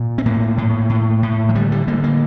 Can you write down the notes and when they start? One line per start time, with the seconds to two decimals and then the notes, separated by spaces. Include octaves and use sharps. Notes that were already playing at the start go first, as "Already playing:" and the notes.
Already playing: A#2
0.18 C4
0.26 A2 A#3
0.58 A2
0.90 A2
1.23 A2
1.49 F3
1.55 D3 G3
1.72 G3
1.87 D3 A#3
2.04 A#3